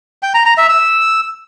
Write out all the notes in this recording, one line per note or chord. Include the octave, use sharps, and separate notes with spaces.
G5
A#5
A#5
E5
E6